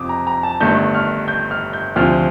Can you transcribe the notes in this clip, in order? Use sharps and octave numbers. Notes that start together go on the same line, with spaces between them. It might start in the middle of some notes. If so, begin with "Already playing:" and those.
Already playing: F2 C3 F3 D6 D#6
A#5
A#5
A5
G1 G2 D#3 A3 G6
F6
G6
F6
G6
D2 C3 F3 F6